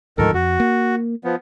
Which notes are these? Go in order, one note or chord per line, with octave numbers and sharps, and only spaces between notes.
D2 G#2 D#3 F3 A4 A#4
F2 F#4
A#3
F3 B3